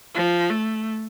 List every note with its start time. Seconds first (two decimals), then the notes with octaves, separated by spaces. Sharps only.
0.15 F3
0.50 A3